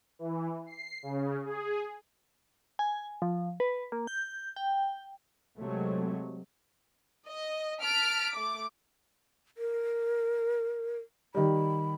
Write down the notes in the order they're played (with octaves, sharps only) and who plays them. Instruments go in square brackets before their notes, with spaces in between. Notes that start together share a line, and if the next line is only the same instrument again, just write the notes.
[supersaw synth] E3
C7
C#3
G#4
[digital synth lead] G#5
F3
B4
A#3
G6
G5
[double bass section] C3 F#3 G#3 A3
[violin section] D#5
A5 F6 B6 D7
A3 D6
[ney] A#4
[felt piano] D#3 G3 [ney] B5